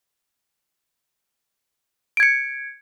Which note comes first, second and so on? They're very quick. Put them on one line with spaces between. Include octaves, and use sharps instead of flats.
D7 G#6 C#7